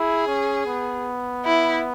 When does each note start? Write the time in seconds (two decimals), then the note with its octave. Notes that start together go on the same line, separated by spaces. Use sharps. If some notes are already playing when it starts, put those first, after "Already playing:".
Already playing: E4 G#4
0.27 C#4
0.67 B3
1.45 E4